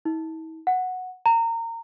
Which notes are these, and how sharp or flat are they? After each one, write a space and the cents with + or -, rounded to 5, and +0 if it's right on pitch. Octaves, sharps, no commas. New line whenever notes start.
E4 -45
F#5 -5
A#5 -25